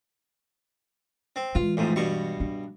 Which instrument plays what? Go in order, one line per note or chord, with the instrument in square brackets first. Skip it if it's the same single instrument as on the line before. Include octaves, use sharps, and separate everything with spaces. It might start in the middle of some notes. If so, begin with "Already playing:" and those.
[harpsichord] C4
[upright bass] E3 G#3 [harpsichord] F4
[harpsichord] A1 F2 G#2
G2 B2 C#6
[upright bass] D4